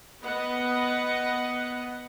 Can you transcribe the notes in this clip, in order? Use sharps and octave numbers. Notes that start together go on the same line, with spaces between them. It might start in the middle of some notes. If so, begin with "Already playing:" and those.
B3 B4 D#5 F#5